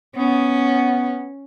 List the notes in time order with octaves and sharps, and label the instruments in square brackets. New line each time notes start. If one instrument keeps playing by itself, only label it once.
[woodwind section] B3 [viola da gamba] C#4